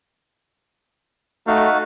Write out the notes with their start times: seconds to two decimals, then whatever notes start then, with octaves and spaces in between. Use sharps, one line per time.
1.47 A3 D#4 F#4 F5